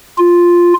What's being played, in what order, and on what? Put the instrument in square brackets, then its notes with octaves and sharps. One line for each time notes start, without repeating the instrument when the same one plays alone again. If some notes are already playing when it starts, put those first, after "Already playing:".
[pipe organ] F4